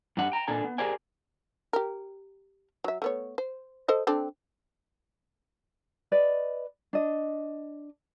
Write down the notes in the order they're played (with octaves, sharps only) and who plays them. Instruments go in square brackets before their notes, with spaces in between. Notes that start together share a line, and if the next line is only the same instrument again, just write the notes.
[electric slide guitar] G2 G3 D4 F#5
G5 A#5
A#2 D4 A4 G#5
B3
G4 G#4 A#4 C5 D5 G#5
[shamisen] G4 A#4
F#3 E5
A3 B3 C#5
C5
A4 C5 D#5
C4 D4 A4
[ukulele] B4 D5 D#5
D4 D#5